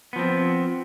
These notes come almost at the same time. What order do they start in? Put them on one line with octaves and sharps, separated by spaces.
B3 F3 C4